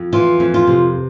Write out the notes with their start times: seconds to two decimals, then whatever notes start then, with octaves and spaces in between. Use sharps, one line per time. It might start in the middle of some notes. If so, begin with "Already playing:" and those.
Already playing: F2
0.13 E3 F4
0.40 F2
0.54 F4
0.67 C3